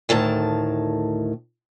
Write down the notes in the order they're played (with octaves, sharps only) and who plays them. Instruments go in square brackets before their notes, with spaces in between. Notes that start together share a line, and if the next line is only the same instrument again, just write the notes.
[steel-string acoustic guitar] D2 A2 D#3 A5